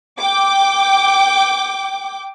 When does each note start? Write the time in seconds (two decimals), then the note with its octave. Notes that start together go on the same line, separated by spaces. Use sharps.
0.19 G5 D6